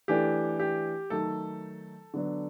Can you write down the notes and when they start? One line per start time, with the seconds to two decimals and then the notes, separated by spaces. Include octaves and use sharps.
0.08 E3 A3 D4 G4
0.60 G4
1.10 D#3 F#3 A3 A4
2.14 D3 F#3 B3 D4